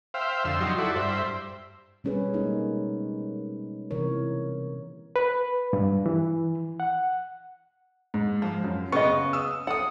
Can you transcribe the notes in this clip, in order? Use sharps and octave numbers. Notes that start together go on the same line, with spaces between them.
C5 E5 F5 G5
F2 D3 C6 E6
F3 F#3 D#4 G4 C6
E4 F#4 A4 D5
G2 C5 E5
B2 G3 C#4 G#4 B4
G#3 A#3 D#4
C3 E3 A#4 C#5
B4
G2
E3
F#5
G#2
F3
F#2
C#3 B3 D#5 C#6
D#6 E6
A4 F#5 D#6